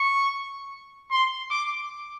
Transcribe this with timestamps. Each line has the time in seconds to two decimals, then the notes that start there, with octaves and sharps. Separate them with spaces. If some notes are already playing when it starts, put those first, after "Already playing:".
Already playing: C#6
1.11 C6
1.51 D6